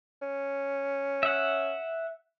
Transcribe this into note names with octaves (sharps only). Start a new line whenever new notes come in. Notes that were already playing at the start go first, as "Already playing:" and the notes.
C#4
E5 F#5